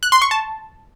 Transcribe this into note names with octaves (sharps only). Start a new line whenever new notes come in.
F#6
C6
C#6
A5